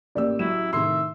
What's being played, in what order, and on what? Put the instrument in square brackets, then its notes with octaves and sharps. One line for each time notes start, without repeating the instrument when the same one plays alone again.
[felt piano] A1 G4 E6 [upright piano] A#3 D5
[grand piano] F#3 [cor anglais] E4 [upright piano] E7
[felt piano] A2 C3 D#3 [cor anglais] E5 [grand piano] C6 C7